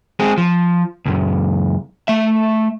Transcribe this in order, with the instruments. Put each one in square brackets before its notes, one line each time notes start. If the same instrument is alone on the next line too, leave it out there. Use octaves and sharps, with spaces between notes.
[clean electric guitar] G#3 C4 G#4
F3
C#2 F#2
A3 E5